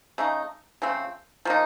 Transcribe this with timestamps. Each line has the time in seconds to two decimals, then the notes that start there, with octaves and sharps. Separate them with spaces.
0.18 C#3 A3 D#4
0.82 C#3 F3 A3 C4
1.45 F3 A#3 D#4